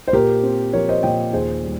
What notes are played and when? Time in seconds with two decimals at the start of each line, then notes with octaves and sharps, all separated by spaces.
0.08 C5
0.13 A#2 G4 A#4
0.43 C4
0.73 F3 A#4 C#5
0.89 C5 D#5
1.03 A#2 D#5 G5
1.33 D#2 G#4 C5
1.64 G3